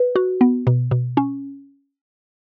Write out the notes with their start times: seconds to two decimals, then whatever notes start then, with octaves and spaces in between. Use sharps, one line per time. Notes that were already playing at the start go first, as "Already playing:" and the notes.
Already playing: B4
0.16 F#4
0.41 B3
0.67 B2
0.91 B2
1.17 C#4